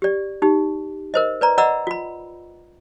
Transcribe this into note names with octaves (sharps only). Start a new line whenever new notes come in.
G4 D5
D#4 G4
A#4 C5 D#5
B4 D5 A#5
D5 D#5 F#5 A#5 B5 E6
F4 B5